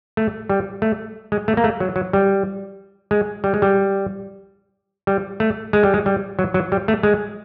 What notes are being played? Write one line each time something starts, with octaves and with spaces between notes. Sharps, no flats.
A3
G3
A3
G#3
A3
A#3
A3
F#3
F#3
G3
G#3
G3
G#3
G3
G3
A3
G#3
G3
G#3
G3
F#3
F#3
G3
A3
G#3